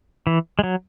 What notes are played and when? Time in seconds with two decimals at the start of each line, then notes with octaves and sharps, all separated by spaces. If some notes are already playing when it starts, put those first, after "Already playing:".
0.27 E3
0.59 G#3
0.64 F#3